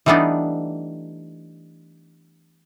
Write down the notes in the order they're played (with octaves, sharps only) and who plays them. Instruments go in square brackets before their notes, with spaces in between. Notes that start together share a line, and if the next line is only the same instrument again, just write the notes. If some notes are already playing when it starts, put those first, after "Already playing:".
[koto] E3 G3 A3 B3 D4 D#4